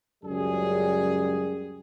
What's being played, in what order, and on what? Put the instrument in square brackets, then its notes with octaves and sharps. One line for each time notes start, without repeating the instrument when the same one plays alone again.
[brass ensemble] C#2 F#2 G3 G#4